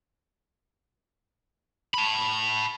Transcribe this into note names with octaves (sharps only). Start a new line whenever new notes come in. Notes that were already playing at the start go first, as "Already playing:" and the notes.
A5 B5